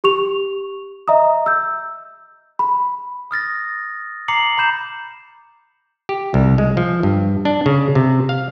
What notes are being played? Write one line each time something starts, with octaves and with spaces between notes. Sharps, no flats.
G4 C#6 F7
D#5 E5 A#5 D#6
E6 G6
B5
D#6 F6 A6 A#6
A#5 D6 C7 C#7 F#7
A#5 B5 G6 E7
G4
C2
G#3
F3
G2
D4
C#3
C3
F5